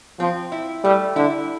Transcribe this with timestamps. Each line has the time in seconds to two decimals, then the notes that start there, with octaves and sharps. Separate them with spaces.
0.20 F3 C4
0.52 E4
0.84 G3 A3
1.16 D3 E4